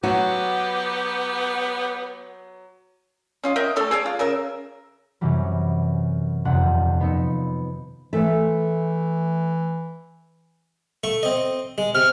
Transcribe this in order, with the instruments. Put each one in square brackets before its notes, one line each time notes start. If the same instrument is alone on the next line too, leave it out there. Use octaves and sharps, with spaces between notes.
[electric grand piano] F#3 [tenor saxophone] B3 [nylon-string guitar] F#4 [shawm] G4
[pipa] C#4 F4 D#5
A#4 D#5 E5 G5
E3 A3 A4 C#5
G#4 C#5 D5
F4
C#3 A#4 E5
[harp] F#2 C3 E3 F#3 G3
D#1 F2 C3 F#5
F3 B3 D#4 E6 C#7
[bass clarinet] E3 [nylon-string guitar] A3 A4 E5
[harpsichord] A3 C#6
C4 D#5
G#3
[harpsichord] C3 [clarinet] F6